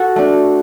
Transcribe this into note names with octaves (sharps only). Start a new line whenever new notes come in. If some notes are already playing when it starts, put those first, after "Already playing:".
Already playing: F#4 A4
A3 D4